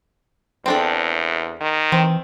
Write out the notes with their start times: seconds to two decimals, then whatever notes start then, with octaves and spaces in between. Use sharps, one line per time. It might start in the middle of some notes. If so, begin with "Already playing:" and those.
0.66 E2 C4 D4 A4
1.61 D#3
1.92 E3 C4